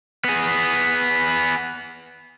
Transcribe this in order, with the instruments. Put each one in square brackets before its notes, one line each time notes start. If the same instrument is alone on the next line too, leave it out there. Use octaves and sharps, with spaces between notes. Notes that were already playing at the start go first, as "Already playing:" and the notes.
[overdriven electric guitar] B3 G#4